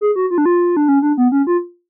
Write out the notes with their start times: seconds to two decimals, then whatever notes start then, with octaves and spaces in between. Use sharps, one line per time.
0.01 G#4
0.16 F#4
0.31 F4
0.38 D4
0.46 F4
0.77 D4
0.88 C#4
1.02 D4
1.18 B3
1.32 C#4
1.47 F4